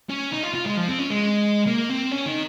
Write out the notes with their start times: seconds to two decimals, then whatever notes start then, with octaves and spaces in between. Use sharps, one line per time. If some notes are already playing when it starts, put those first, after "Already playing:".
0.10 C#4
0.33 D#4
0.44 F4
0.55 F4
0.66 G#3
0.78 F3
0.88 C4
0.99 C#4
1.10 G#3
1.67 A#3
1.90 C4
2.12 C#4
2.27 D#3